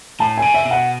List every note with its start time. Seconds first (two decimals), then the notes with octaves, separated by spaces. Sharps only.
0.20 A2 A5
0.38 C#3 G#5
0.54 E5
0.65 B2
0.71 F#5